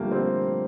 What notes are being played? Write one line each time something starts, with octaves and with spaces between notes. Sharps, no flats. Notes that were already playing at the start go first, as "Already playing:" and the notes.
Already playing: G2 D3 F3 G3 A3 A#3
C4